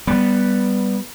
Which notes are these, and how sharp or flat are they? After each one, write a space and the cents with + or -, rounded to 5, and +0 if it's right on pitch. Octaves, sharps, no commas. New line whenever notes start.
G3 +0 B3 +0